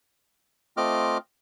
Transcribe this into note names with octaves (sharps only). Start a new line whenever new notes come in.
A3 C4 F4 D#5 D6 F6